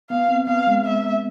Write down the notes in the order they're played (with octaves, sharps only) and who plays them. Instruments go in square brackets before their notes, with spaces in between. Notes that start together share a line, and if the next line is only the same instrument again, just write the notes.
[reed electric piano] B3 [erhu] F5
[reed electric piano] C4
[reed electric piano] B3 [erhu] F5
[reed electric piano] G#3
[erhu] E5